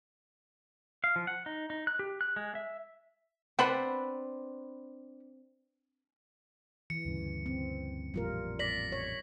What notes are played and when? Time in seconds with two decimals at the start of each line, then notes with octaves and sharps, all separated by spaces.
1.04 F5
1.16 F3
1.27 F#5
1.46 D#4
1.70 D#4
1.87 F#6
1.99 G4
2.21 F#6
2.36 G#3
2.55 E5
3.59 B3 C4 D4 B4 F#5 B5
6.90 E3 C#7
7.05 D2 G2 C#3
7.46 C4
8.14 A1 F2 A#2 G3 F4 A#4
8.59 D5 A#6 B6 F#7
8.92 C#5